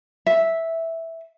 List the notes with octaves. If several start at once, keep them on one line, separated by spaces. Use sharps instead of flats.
E5